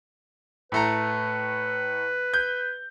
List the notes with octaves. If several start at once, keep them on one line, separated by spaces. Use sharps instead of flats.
A2 A3 B4 A#5
G6